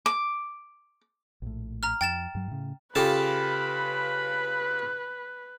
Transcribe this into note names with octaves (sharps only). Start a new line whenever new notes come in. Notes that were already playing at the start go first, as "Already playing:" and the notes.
D6
A#1 A2
A#5 F6
F2 G5 A6 E7
G2 F#3
A2 C#3
C#3 F4 G4 A4 B4 A5 B5